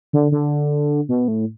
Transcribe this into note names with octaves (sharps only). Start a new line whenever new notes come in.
D3
D3
B2
A2